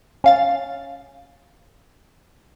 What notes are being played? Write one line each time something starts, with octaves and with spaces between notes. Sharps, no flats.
C#4 F5 A6